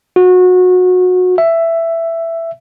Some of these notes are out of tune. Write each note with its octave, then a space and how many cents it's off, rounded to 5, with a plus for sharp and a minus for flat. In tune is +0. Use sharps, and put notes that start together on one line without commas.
F#4 -25
E5 +10